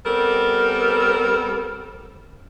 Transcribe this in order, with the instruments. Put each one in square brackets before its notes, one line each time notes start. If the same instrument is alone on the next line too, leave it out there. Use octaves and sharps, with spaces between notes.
[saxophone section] G3 B3 C4 A4 A#4